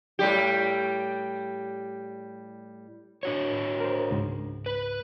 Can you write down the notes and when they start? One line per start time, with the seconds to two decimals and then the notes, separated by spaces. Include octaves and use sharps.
0.19 A2 G3 G4
3.23 D4 F#4 C#5
3.80 A#4 C5
4.11 C#2 G#2
4.66 B4